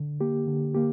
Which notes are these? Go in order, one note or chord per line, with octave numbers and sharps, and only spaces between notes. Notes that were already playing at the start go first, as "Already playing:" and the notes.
Already playing: D3
A#3 G4
D3
A#3 G4